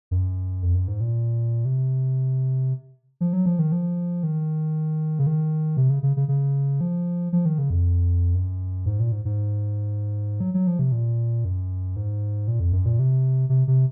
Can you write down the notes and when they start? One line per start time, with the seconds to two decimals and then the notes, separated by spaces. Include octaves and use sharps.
0.11 F#2
0.62 F2
0.75 F#2
0.88 G#2
1.01 A#2
1.65 C3
3.21 F3
3.33 F#3
3.46 F3
3.59 D#3
3.72 F3
4.23 D#3
5.19 C#3
5.27 D#3
5.77 C3
5.90 C#3
6.03 C#3
6.17 C#3
6.28 C#3
6.81 F3
7.33 F3
7.45 D#3
7.58 C#3
7.70 F2
8.35 F#2
8.86 G#2
9.00 A#2
9.12 G#2
9.25 G#2
10.40 F#3
10.54 F#3
10.67 F3
10.79 C3
10.92 A#2
11.45 F#2
11.96 G#2
12.48 A#2
12.60 F2
12.72 F#2
12.86 A#2
12.99 C3
13.49 C3
13.68 C3